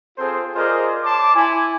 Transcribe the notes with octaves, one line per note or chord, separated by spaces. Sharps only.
C4 F4 G#4 A4 C5
F4 G#4 A#4 C5 D5 D#5
C#5 A5 C6 D6
E4 G#5